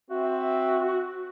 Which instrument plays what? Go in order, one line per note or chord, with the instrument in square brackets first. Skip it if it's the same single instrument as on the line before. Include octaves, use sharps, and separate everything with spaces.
[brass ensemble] C4 E5 [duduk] F#4